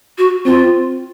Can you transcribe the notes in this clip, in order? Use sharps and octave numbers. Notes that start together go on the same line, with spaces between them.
F#4
C4 F4